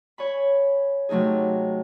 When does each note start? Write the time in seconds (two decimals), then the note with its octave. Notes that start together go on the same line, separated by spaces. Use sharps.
0.18 C#5 G#5 B5
1.09 C3 F#3 A3 D#4 G#4